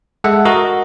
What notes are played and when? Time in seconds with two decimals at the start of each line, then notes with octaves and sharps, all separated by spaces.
0.24 G#3 A4 E5 F#5
0.45 F#4 A#4 D#5